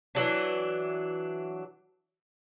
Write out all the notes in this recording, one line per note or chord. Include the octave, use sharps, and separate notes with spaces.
E3 F#3 D4